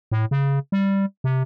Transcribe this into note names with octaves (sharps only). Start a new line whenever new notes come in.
A2
C#3
G3
C3